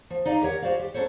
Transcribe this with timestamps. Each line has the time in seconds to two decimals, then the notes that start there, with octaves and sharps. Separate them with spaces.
0.10 F3
0.26 D#4 D5 D#5 F5
0.41 G4 A#4 C#5 F#5
0.62 F#4 C5 D5 F5
0.79 G4
0.94 C#4 D4 E4 A4 C5 C#5